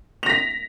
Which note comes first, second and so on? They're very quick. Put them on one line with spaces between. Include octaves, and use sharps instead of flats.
F7 A#6 B6